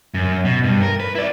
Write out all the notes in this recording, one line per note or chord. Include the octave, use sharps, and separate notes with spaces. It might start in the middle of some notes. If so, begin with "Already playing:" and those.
F#2
B2
G2
A#4
B4
E4 D5